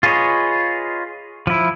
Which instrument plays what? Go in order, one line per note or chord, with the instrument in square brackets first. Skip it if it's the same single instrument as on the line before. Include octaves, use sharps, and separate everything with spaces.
[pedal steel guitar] F4 G#4 B4 C#5 D#5
F3 E4